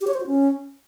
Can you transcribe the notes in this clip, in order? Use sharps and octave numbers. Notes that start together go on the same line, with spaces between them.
G4
C#5
C5
F#4
C#4